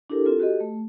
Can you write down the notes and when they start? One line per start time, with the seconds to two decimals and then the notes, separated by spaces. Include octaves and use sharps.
0.10 D4 E4 G4 A4 A#4
0.25 C4 F4 A4
0.39 F#4 G4 A4 D#5
0.60 A3